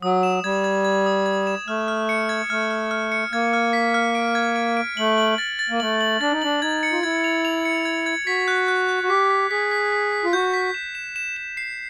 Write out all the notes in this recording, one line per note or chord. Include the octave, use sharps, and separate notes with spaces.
F#3 D#6
E7
G3 G#6
G#6
G#6
D#6
G#6
E7
A3 F6
F6
C#7
G#6
A3 F6
F6
F6
C#7
A#3 G#6
F6
B6
F6
D7
G#6
D7
D7
A3 F#7
F#7
A6
A6
A#3
A3 F#7
F#7
D4 A6
D#4
D4 F#7
D#4 G#6
C#7
F4
E4 G#6
F7
F7
C#7
G#6
G#6
F#4 B6
F#6
F#6
F#6
F#4
G4 B6
B6
G#4 B6
B6
B6
B6
F4
F#4 G6
B6
E7
E7
E7
E7
C7